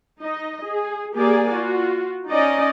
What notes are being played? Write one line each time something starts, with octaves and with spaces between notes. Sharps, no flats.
D#4 D#5
G#4
A#3 G4 G#4 D5 G#5
F4 F#4
C#4 D#4 D5 D#5